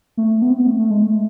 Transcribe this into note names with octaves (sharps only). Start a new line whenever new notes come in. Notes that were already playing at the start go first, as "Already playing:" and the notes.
A3
B3
C4
B3
A3
A3
G#3
A3